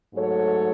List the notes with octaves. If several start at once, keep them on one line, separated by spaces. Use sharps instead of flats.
G#2 F#3 A3 A4 C#5